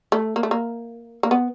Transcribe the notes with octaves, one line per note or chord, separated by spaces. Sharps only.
A3
A#3
A3
A#3
A#3
B3